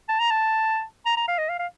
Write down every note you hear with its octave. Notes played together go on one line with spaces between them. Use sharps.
A5
A#5
A5
A#5
A#5
F5
D#5
F5
F5